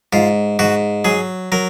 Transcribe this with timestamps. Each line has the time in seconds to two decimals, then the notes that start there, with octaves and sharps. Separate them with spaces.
0.13 G#2 F4
0.59 G#2 F#4
1.05 F#3 G#4
1.52 F#3 A#4